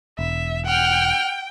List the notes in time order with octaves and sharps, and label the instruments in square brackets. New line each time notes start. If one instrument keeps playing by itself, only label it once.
[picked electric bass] E1 [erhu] E5
[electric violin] F#5 F6 [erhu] G5